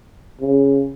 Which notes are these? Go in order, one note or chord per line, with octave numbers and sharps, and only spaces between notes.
C#3